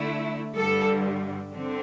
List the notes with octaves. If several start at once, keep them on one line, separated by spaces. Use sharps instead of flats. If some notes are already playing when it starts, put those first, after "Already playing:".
Already playing: D3 A3 E4
G2 D3 G3 A4
D3 C4